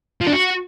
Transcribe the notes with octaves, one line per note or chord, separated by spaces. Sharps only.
F3
D4
F#4